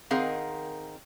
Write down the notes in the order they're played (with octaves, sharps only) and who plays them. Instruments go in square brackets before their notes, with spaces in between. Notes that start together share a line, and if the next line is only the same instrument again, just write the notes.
[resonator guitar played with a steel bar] D#3 C4 G#4 A#4 F5 F#5